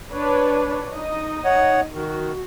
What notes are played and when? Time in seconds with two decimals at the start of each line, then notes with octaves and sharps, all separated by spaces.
0.11 D4 B4 C#5
0.92 D#4 D#5
1.45 C#5 F#5
1.93 D#3 F#4